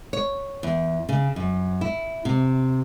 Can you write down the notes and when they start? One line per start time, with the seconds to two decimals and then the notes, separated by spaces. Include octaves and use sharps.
0.13 C#5
0.63 E2
1.09 C#3
1.36 F#2
1.81 E4
2.25 C3